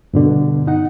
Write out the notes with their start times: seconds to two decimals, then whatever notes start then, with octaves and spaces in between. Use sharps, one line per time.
0.14 G2 B2 D3
0.67 D#4 F#5